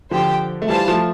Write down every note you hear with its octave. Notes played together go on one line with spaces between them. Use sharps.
D3 F3 G4 C5 G5
A3
E3 G3 F4 C5 F5 A5
F3 A3